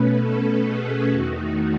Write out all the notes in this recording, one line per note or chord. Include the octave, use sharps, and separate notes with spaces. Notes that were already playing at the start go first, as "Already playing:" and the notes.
Already playing: B2 A3 C#4 B4
A4
G#4
E2 D#3 A3 D#4 F#4